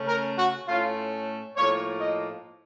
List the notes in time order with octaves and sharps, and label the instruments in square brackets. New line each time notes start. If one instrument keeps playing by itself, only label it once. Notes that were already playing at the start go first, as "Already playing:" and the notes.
Already playing: [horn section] C#3 A3 C#4
A#4
F#4
A2 A3 C#4 F4
A2 F3 A#3 C#5
D#5